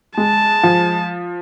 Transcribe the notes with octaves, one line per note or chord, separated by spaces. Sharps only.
G#3 A5
F3